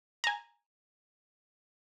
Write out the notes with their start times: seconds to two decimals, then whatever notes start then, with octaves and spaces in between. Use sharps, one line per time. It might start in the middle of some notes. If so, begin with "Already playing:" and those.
0.24 G#5 A#5